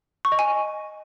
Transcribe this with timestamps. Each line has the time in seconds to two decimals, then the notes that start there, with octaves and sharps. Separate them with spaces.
0.25 C#6
0.32 D#5
0.39 G#5